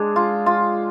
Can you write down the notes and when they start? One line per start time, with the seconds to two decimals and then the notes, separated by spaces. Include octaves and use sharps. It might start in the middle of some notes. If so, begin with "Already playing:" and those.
Already playing: G#3 D4 G#4
0.16 F4
0.46 F4